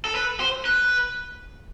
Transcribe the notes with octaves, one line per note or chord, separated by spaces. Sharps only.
A4
B4
C5
B4